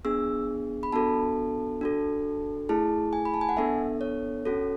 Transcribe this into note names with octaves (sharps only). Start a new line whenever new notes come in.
B3 D4 G#4 E6
B5
B3 D4 F#4 A4 A5
D4 F#4 A4
A3 E4 G#4 A5
G#5
B5
A5
G#5
F#5
B3 D4 A4 E5
C#5
C#4 F#4 A4